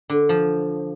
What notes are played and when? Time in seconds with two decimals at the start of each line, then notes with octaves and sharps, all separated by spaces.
0.10 D3
0.29 F3